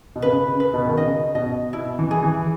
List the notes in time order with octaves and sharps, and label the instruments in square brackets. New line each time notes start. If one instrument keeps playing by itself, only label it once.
[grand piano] B2
[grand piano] C#3 [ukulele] B4
[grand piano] C#3
[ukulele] B4
[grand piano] B2
D#3
[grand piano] C#3 [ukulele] D#5
[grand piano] B2 [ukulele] D#5
[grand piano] B2 [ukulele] E4
[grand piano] E3
[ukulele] G#4
[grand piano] E3